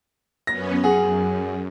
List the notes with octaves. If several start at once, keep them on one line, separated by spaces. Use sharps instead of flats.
F#2 B3 C#4 A#6
F#2 G#4 F#5